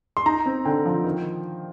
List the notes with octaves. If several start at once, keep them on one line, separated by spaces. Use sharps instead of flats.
C6
D#4 A#5
C4
D3 G5
F3
D#3